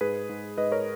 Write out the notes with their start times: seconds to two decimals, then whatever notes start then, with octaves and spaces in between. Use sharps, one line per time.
0.01 G#2 G#4 B4
0.29 G#2
0.58 G#2 B4 D#5
0.72 A#4 C#5